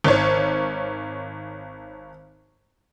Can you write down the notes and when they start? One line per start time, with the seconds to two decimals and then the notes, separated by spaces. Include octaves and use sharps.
0.04 G#1 C#5